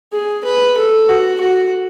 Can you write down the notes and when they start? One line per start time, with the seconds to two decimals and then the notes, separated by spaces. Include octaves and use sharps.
0.13 G#4
0.45 B4
0.77 A4
1.09 F#4
1.41 F#4